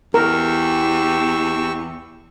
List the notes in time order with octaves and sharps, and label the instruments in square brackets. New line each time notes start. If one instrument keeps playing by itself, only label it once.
[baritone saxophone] E2 [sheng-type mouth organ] G4 C#6 E6 [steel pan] A#4